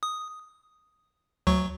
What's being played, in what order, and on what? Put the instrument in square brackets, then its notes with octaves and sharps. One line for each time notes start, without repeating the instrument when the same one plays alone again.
[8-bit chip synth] D#6
D2 F#3 C#6